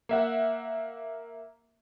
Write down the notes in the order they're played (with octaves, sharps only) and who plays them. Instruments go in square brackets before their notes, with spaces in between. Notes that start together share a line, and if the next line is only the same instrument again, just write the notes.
[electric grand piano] A#3 E5 F#5